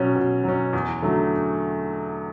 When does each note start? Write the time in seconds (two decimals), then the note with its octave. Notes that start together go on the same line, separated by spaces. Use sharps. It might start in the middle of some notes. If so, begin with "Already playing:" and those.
Already playing: B2 F#3 C#4
0.15 B2
0.44 F#3 C#4
0.73 E2
1.02 D3 F#3 A3